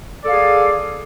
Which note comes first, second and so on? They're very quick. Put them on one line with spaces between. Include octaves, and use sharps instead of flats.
D5 A4 F5 G#4